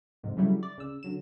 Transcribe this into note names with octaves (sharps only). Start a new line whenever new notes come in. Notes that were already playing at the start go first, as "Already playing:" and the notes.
F2 G#2 C3
C#3 F#3 G3 A3 E4
D5
C#3 E6
D3 F#3 E7